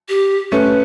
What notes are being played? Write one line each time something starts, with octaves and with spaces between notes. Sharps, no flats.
G4
A3 C#4 B4